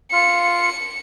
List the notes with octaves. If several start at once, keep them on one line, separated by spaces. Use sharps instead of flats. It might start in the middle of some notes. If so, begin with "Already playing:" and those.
F4 F5 C#7